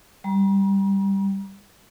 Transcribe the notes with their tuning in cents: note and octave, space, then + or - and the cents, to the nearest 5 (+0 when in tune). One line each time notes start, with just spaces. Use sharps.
G3 +0 A#5 +40